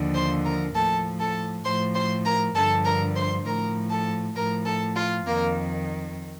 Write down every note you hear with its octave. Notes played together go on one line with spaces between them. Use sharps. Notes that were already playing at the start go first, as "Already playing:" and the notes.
Already playing: D#2 D3 F3
C5 C6
A#4 A#5
A2 F3 A4 A5
A4 A5
A2 F3 C5 C6
C5 C6
A#4 A#5
G2 D3 F3 A4 A5
A#4 A#5
C5 C6
A2 F3 A#4 A#5
A4 A5
A2 F3 A#4 A#5
A4 A5
F4 F5
F2 D#3 A#3 A#4